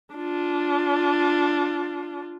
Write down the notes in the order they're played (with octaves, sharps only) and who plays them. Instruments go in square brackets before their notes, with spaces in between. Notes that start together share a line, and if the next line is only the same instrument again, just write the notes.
[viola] D4 F4